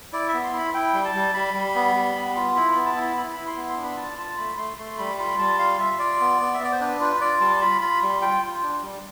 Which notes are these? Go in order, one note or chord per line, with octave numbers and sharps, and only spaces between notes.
E4 D5
B3 E5
C6
E4
B5
E4 G5
G3
A5
G3
G3 B5
G3
B3
G3
B3
F4
E4 B5
B3 B5
A5
E4
B5
E4 B5
E4 B5
C6
B3
C6
D4
B5
F4 A5
F4 A5
A3 B5
A3 C6
A3 C6
G3 B5
F4 B5
G3 A5
F4 F5
F4 E5
F4 D5
B3
B3
E5
B3 D5
C5
D4 B4
F4 B4
F4 D5
G3 A5
F4 B5
F4 B5
G3
F4 G5
F4
D4
G3